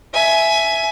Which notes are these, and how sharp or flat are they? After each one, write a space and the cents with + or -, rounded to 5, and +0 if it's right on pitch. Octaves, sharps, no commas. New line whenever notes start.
E5 +5 G#5 +20